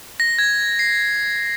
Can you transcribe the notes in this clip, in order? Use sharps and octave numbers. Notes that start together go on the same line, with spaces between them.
A#6
G#6
C7